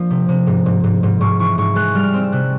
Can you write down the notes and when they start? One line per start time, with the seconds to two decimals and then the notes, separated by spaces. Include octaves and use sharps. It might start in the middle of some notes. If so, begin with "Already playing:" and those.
Already playing: F3 A#3 D4
0.10 C3
0.29 C3
0.47 G#2
0.66 G#2
0.84 G#2
1.03 G#2
1.21 G#2 C#6
1.39 E3 C#6
1.58 G#2 C#6
1.76 G#3 F#6
1.95 G3 F6
2.13 C4 E6
2.32 C3 F#6